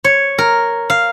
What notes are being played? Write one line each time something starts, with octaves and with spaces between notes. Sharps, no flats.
C#5
A#4
F5